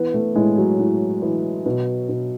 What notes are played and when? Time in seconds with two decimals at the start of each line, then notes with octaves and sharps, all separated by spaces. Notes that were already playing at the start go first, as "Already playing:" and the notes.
Already playing: E3 B3
0.14 A3
0.35 A2 G#3
0.58 F#3
0.79 A2
1.22 E3
1.66 B2
2.09 B2